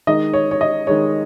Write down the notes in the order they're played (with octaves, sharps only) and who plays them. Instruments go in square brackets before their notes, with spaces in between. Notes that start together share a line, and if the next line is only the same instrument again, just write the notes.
[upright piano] D#3 G#3 D#4 D#5
C#5
C#5
D#5
D#3 G#3 D#4 C#5